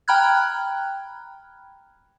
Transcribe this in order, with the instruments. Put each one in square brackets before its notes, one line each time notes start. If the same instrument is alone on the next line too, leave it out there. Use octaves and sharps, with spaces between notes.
[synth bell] G5 A#5 B5 F6 F#6 G#6